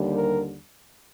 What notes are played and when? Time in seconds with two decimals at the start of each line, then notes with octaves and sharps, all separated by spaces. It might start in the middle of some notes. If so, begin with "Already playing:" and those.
Already playing: D#2 D3 G3
0.15 A#4